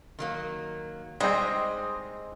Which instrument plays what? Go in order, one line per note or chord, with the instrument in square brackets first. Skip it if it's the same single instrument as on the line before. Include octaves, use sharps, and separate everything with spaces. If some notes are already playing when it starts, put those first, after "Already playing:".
[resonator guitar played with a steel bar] D#3 F#3 A#3
[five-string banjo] G3 G#4 [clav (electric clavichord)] G#3 C4 [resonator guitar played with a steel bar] D#4 C5 [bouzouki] D#5